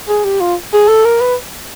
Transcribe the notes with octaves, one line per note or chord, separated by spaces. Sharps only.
G#4
G4
F4
G#4
A4
A#4
B4